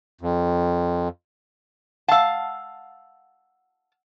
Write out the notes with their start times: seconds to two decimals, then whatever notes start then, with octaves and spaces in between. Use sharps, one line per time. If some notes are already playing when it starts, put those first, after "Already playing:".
0.21 F2
2.08 F5 F#5 A5 E6